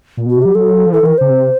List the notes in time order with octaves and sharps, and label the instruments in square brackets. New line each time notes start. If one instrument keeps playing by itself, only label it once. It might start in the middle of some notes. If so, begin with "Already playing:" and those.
[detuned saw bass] A#2
[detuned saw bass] B2 [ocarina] F#4
[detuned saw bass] C3
[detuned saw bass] F#3 [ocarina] G4
[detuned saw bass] F#3 [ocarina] A4
[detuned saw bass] F3
[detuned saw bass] E3 [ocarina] A4
[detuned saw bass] E3 [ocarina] A#4
[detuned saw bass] C#3 [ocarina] C5
[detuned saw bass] C3